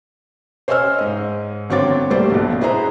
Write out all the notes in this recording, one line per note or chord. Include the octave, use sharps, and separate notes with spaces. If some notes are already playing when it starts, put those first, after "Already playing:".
C5 C#5 D#5 G#5 E6 F6
G#2 D#5
G1 C4 F#4 C#5 D6 A6
G3 A3 A#3 F#4 C5 D5
B1 B2
B3 E4 G#4 B4 C5 A#5